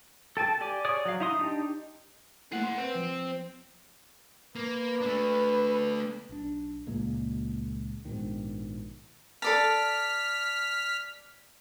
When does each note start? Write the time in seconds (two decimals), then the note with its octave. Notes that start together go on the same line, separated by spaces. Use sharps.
0.37 A4 G5 A5
0.61 G4 D5 G#5 D6
0.85 G#4 C#5 D5 D#6
1.06 F#3 F5
1.20 D#4 E4 A#5 C6 D#6
1.39 D4 D#4 G4
2.52 A3 A#3 E4 G#4 F#5
2.63 C6
2.78 C4 B4
2.95 F3
4.56 A#3 B4
5.01 A3 D4
6.29 B1 D4
6.87 C#2 A#2 G#3 A#3
8.05 A#1 G#2 B2 D#3
9.42 A4 D5 A5 F6 B6